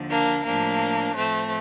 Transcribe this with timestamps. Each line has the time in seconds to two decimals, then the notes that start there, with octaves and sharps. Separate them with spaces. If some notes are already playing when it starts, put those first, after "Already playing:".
Already playing: D#2 D3 F3
0.09 A#3 D4
0.44 A2 F3 A#3 D4
1.15 A2 F3 A3 C4